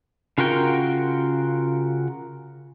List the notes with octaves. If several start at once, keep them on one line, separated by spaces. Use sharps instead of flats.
C#3 F4 F#4 A#4 G5